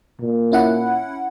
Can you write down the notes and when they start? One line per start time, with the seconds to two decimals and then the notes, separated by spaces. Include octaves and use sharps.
0.21 A#2
0.52 C#4 E4 F#5